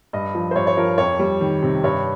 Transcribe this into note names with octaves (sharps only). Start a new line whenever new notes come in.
G2 D#5
F3
C5
G2 C#5
C#5
F3 A#4
F2 C#5
G3
D#3
C3
G2 C#5